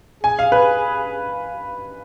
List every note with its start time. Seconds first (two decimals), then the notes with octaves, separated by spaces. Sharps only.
0.24 G#4 G#5
0.39 F5
0.52 B4